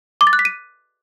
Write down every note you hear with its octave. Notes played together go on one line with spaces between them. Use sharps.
D6
A6
F#6
B6
D#7